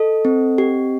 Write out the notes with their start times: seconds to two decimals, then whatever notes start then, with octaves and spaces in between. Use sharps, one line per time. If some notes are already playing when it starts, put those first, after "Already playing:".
Already playing: A4 D#5
0.25 C4
0.58 G4